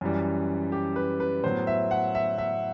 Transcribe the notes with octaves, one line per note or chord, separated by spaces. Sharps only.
F#2 E3 G3
G4
B4
B4
A2 F#3 B3 C5
E5
F#5
E5
E5